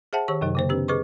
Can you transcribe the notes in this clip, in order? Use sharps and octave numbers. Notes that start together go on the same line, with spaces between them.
G#4 C5 E5 F#5 A5
D#3 G4 C#5 C#6
F#2 C3 F#3 D#4
C#3 A#3 C5
C4 D4 G4 B4
G#4 B4 C5 D#5 C#6 D6